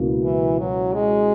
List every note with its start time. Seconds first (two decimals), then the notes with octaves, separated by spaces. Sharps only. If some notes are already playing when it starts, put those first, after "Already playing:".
Already playing: C#2 B2 A#3 E4
0.24 E3
0.59 F#3
0.93 G#3